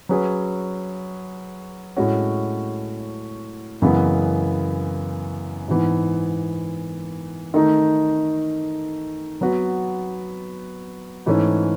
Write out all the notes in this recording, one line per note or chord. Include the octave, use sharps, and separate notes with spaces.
F#3 C#4 G#4 B4
A2 G#3 C#4 F#4
F#2 C#3 E3 G#3 B3
G#2 E3 B3
D#3 A3 D#4
F#3 B3 F#4 B4
G#2 E3 A3 C#4